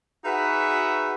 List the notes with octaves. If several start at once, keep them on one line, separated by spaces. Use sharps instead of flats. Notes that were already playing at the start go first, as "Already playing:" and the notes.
D#4 F#4 G#4 B4 E5 F#5